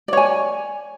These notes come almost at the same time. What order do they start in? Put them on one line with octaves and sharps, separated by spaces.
D5 C#5 G#5